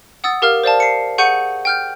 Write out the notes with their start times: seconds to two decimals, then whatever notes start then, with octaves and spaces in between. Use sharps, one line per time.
0.24 F#5 D#6 E6 A6
0.42 G4 A#4 F5 F6
0.63 C5 D5 F5 A5
0.80 C7 C#7
1.18 G#4 F#5 C#6 G6 C#7 D#7
1.65 G5 F6 G6